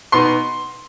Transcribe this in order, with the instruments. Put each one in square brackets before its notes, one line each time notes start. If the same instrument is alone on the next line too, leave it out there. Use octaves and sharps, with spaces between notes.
[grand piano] B2 B3 D#4 B4 [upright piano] C6